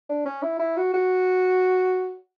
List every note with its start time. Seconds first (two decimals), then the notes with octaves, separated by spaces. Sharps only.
0.10 D4
0.26 C#4
0.43 E4
0.59 E4
0.77 F#4
0.94 F#4